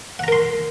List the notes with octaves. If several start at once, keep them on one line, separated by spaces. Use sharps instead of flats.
A#4 F#5 A#5 C6